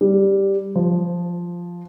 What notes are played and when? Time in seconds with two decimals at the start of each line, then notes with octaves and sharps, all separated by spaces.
0.01 G3
0.75 F3